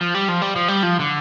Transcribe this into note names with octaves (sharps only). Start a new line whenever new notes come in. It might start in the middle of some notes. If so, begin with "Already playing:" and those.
F3
G3
F3
G3
F3
G3
F3
D3